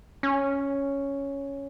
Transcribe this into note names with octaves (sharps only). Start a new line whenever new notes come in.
C#4